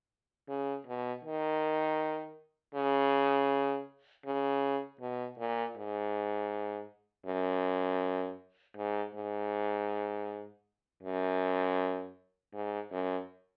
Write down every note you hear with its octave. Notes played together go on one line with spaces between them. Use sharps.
C#3
B2
D#3
C#3
C#3
B2
A#2
G#2
F#2
G#2
G#2
F#2
G#2
F#2